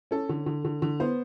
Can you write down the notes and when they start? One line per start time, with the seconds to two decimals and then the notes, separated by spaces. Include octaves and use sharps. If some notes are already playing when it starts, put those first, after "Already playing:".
0.11 C#4 A4
0.29 D3
0.46 D3
0.65 D3
0.82 D3
1.00 B3 C5